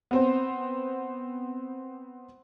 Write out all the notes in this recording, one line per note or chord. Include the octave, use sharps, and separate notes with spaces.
B3 C4 C5